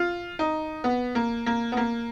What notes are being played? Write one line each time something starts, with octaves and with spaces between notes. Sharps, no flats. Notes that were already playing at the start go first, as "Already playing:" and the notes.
Already playing: F4
D#4
B3
A#3
A#3
B3
A#3